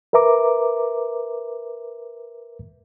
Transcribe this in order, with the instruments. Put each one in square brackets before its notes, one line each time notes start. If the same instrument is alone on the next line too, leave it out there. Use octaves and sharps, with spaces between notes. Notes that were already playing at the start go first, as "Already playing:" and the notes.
[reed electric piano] A#4 B4 E5 A#5 D6